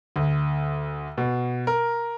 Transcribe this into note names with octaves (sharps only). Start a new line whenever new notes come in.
D2
B2
A#4